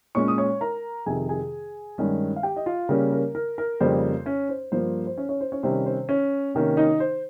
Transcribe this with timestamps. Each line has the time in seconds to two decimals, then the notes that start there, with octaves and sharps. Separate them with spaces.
0.15 A#2 G#3 C#4 C#5 C#6
0.28 D#6
0.38 C#5 C#6
0.61 A#4 A#5
1.06 F2 C3 D#3 G#4 G#5
1.29 G#4 G#5
1.98 G2 D#3 G#3 C#4
2.36 F5
2.43 G4 G5
2.56 D#5
2.66 F4 F5
2.89 C#3 G3 A#3 C#4 A#4
3.12 A#4
3.35 A#4
3.58 A#4
3.80 F2 C#3 G3 A#3 C5
4.26 C#4 C#5
4.49 C5
4.72 G2 F3 A#3 C5
5.07 C5
5.17 C#4 C#5
5.29 C#4 C#5
5.41 C5
5.52 C#4 C#5
5.63 C3 D#3 G3 C#4 C5
5.86 C5
6.09 C#4 C#5
6.55 C3 D#3 A#3 C#4
6.77 D#4 D#5
7.00 C5